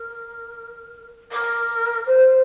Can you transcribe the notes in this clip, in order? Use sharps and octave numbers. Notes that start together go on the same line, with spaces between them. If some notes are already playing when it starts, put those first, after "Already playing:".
Already playing: A#4
A#4
C5